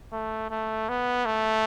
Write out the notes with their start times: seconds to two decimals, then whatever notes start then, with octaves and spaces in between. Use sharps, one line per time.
0.13 A3
0.50 A3
0.89 B3
1.26 A3